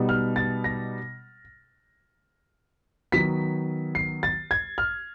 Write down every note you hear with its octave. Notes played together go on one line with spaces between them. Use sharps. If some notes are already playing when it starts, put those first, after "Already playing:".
Already playing: B2 G3 B3 D#4
F6
A6
A#6
D#3 F#3 B3 B6
C7
A6
G#6
F6